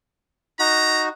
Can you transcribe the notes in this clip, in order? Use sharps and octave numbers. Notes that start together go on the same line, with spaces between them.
D#4 F#4 A#5